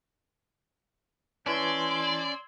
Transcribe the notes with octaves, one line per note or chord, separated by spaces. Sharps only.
E3 C#4 B4 D5 A5 C6 E6 G#6